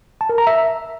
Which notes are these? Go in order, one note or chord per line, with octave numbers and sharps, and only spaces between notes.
A5
A#4
A#5
E5